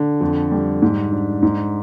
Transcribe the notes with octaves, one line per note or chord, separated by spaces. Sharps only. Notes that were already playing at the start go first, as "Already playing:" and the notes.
Already playing: D3
F2
G3
G#2
D4
G#2